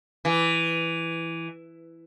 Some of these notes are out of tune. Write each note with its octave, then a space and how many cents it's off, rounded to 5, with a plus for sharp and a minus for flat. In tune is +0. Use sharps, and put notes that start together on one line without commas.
E3 +5